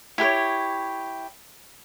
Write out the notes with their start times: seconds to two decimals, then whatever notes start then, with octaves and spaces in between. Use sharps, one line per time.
0.18 E4 G4 B4 C#5